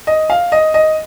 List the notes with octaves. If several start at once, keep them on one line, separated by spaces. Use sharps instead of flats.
D#5
F5
D#5
D#5